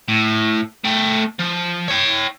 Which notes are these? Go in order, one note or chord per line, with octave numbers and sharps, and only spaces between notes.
A2
A3 G5
F3
C#5 G5